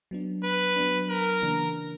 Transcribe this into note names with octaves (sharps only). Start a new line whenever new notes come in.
F#3 B3 D4
B4
F#3 B3 D4
A#4
C#3 E3 A#3 D4